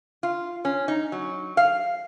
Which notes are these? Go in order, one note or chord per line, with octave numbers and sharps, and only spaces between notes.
F4
C#4
D#4
F#3
F5